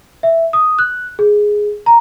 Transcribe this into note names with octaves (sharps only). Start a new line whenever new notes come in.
E5
D#6
F#6
G#4
A#5